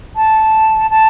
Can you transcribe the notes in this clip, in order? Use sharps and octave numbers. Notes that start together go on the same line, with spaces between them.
A5
A5